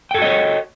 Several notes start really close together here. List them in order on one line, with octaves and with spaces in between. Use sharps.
G5 A4 F#4 D#5 C#5